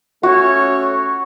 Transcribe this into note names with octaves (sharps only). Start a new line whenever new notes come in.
A3 C#4 F#4 A4 C#5